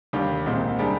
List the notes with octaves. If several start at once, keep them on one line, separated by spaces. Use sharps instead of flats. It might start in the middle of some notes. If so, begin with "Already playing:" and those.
D#2 D3 G3
C2 A#2 G#3 C4
C3 G3 D4 G#4